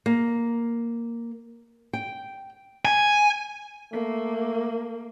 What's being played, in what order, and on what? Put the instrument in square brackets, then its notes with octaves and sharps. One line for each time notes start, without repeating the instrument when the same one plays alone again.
[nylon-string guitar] A#3
G5
[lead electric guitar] G#5
[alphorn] A3 [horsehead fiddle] A#3